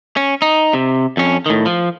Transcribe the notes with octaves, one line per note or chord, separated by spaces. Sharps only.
C#4
D#4
C3
F2 C#4
A2 D#3
F3